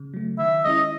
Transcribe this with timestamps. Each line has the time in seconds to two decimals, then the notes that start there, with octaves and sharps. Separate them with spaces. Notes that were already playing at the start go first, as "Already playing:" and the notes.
Already playing: C#3
0.14 F#3 A3
0.39 D#3 E5
0.65 G#3 C#4 E4 D#5